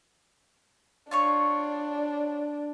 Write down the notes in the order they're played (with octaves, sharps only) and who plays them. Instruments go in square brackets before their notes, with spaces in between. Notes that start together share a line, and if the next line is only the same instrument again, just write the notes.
[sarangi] D4 [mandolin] F4 C#5 C#6